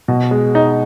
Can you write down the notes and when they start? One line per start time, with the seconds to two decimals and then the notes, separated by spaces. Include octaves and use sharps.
0.08 B2
0.31 G#3
0.55 D#4